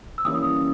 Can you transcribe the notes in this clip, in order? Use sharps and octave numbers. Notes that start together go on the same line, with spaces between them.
E6
E3 G3 A#3 C#4 E4 D#6